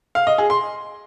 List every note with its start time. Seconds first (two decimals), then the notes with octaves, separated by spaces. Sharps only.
0.15 F5
0.27 D#5
0.38 G#4
0.50 C6